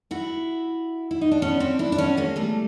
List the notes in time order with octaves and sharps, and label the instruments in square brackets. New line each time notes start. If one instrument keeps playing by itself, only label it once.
[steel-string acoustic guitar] E4 F#4
E4
D#4
D4
B3 C#4
C4 D4
D4 E4
D4
B3 C#4
G#3 A#3
G3 A3